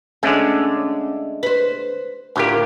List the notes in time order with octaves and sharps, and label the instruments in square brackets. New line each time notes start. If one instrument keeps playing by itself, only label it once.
[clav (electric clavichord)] D3 G#3 A3 [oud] C#4
[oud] B4 C5
[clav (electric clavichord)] D2 G4 [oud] A2 F4 A#4